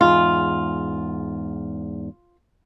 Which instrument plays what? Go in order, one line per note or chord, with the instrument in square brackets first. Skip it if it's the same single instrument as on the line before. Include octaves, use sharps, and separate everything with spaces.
[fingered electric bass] E2 G#2 [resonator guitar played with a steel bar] F4